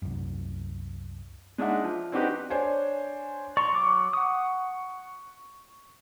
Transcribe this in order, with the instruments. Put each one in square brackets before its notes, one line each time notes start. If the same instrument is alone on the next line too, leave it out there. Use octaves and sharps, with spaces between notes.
[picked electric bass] C2 F#2
[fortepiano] G#3 D4 D#4 E5 F#5
F3
C4 D4 D#4 F#4 G4 B4
[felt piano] D4 C5 C#5 G#5
[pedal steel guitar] D5 A#5 C6 [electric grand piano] C#6
[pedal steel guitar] F#3 D6
F#5 D#6